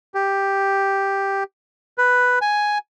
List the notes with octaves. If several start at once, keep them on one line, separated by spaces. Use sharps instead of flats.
G4
B4
G#5